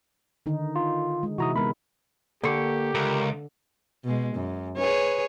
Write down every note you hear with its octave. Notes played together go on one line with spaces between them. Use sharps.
D3 D#3 D#4
F4
G#3
C3 E3 E4 F#4 A#5 D#6
G#3 B3 A#4 B5
D3 A#3 G4 C#6 D6
C#2 A#4
B2 G#3
F#2
G#4 B4 C#5